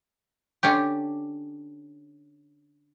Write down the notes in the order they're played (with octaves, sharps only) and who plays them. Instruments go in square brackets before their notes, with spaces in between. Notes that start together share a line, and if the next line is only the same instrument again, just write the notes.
[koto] D3 C#4 D4 G4